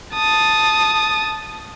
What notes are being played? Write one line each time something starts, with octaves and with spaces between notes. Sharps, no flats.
A5 D#6